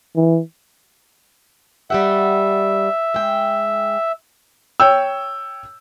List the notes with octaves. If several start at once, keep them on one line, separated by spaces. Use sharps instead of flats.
E3
G3 G4 E5 F#5
G#3 G5
C#5 G5 E6